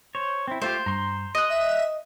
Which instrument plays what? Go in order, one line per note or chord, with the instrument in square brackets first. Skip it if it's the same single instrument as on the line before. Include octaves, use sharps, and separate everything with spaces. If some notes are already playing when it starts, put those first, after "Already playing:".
[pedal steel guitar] C5 C#5
C4 E4
[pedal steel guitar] A3 F4 G4 [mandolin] C5
[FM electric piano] G2 [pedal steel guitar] A#5 C6
[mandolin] D#5 [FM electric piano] F#6 A#6
[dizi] E5